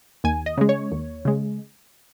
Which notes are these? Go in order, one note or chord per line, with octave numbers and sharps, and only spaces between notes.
D#2 G#5
D#5
C#3 G#3
C#5
D#2
C#3 G#3